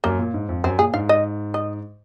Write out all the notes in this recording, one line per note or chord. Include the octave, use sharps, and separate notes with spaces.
F#2 A#3
A#2
G#2
F2
F#2 C4
A#2 G#4
G#2 F5
D#5
D#5